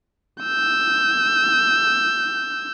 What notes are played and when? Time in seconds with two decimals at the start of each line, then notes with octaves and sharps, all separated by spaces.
0.42 E6 G6